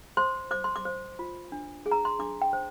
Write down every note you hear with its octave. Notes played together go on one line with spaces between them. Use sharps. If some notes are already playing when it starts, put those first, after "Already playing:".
C5 C6
C5 D6
C6
D6
C5
F4
D4
G#4
A#5
C6
D4 D6
G5
C5